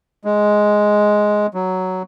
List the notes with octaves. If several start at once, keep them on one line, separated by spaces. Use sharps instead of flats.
G#3
F#3